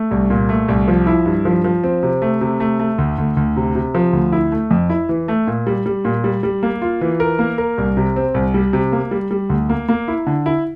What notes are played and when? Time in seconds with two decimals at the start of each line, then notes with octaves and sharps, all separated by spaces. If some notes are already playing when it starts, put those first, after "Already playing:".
Already playing: A3
0.11 C2
0.30 A#2
0.49 A3
0.68 C2
0.88 F3
1.07 E4
1.26 G2
1.45 F3
1.64 F3
1.84 C4
2.03 C3
2.22 A3
2.41 C3
2.60 A3
2.79 A3
2.98 D2
3.18 D2
3.37 D2
3.57 C3
3.75 C3
3.95 F3
4.13 D2
4.32 E4
4.52 A3
4.71 F2
4.90 E4
5.09 E3
5.28 A3
5.47 A#2
5.67 G3
5.86 G3
6.05 A#2
6.24 G3
6.43 G3
6.63 A#3
6.82 F4
7.01 E3
7.20 A#4
7.39 A#3
7.58 A#4
7.78 C2
7.97 C3
8.16 C4
8.34 C2
8.54 G3
8.73 C3
8.92 A#3
9.11 G3
9.31 G3
9.50 D2
9.70 A#3
9.89 A#3
10.08 E4
10.27 D3
10.46 E4